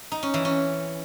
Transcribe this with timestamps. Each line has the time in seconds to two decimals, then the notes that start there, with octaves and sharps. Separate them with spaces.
0.12 D#4
0.23 C#4
0.34 E3
0.45 C#4